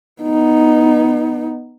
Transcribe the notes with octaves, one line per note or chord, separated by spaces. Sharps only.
B3 D#4